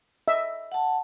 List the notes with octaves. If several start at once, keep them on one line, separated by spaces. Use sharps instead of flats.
D#5 E5
F#5 A5